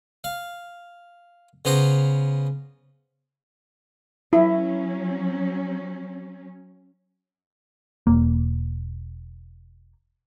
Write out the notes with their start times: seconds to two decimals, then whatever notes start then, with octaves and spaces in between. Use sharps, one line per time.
0.24 F5
1.65 C#3 B3 C5 A#5
4.33 F#3 C#4 E4
8.07 E1 A#3